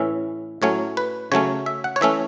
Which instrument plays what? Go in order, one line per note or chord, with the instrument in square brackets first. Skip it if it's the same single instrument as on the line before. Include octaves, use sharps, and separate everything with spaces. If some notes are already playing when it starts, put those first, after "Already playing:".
Already playing: [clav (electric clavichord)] A2 E3 C#4 E5
A2 F#3 A3 C#4 C#5
B4
C#3 F#3 A3 C#4 C#5
E5
F#5
C#5
E3 A3 C#4 E5